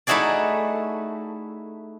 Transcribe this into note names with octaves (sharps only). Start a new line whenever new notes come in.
A3 D#4 E4 F#4 G#4 D5